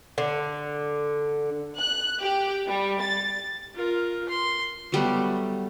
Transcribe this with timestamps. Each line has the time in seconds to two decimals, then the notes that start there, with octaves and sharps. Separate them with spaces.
0.18 D3
1.77 F#6
2.21 G4
2.68 G3
3.01 A6
3.75 F4 A#4
4.29 C6
4.92 F#3 G3 A3 B3